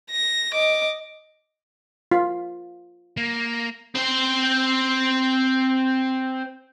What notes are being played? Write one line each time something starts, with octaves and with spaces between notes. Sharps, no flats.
A#6
D#5 D6
F4
A#3
C4 C5